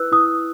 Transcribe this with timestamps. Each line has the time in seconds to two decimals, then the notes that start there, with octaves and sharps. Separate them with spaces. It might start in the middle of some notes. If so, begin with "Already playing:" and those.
Already playing: E4 B4 E6 F#6
0.12 E4 D#6